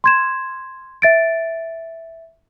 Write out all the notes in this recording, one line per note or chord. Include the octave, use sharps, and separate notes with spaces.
C6 G#6 E7
E5 A6 D7